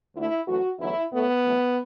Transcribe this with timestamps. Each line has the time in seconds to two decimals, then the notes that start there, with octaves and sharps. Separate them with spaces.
0.14 D2 D3 A3 E4
0.46 F#2 E3 A3 F#4
0.78 E2 D3 F#3 A3 E4
1.10 A2 A3 B3
1.43 F#2 E3 A3